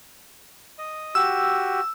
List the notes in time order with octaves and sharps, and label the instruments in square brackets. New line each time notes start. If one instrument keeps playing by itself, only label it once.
[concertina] D#5
[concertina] F#4 G4 [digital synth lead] E6